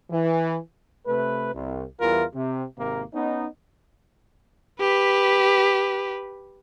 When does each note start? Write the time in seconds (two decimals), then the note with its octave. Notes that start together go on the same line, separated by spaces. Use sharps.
0.11 E3
1.07 C3 A3 B4
1.55 C2
2.00 E2 E3 G3 F4 A#4
2.35 C3
2.77 G#1 C3 A#3
3.14 B3 C#4 D#4
4.80 G4 B4